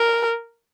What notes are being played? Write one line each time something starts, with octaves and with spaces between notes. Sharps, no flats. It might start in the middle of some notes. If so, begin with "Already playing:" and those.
Already playing: A#4